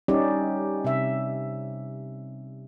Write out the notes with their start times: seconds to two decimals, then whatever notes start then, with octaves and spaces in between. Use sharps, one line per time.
0.08 G3 C#4 D#4 G4 D5
0.84 C3 E5